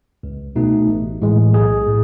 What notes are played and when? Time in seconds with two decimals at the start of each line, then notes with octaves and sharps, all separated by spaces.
0.23 C#2
0.56 B2 A3 D#4
0.88 A1
1.22 A2 E3 G#3
1.54 B1 G#4
1.87 A2